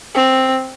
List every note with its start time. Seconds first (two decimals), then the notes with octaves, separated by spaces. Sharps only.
0.15 C4